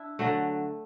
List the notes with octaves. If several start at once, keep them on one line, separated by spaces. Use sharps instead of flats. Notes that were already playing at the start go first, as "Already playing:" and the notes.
Already playing: D4 E4
D3 F#3 A3